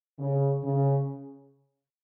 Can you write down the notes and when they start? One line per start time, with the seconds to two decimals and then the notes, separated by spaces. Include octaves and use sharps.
0.19 C#3
0.64 C#3